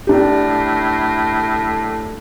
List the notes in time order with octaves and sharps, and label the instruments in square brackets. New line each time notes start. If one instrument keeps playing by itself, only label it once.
[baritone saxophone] A2 [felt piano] D4 G4